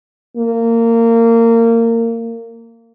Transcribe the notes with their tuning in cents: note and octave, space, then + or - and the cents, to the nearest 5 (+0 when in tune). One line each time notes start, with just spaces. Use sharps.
A#3 -25